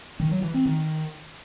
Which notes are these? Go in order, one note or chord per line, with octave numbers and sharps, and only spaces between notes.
D#3
F#3
E3
C4
D#3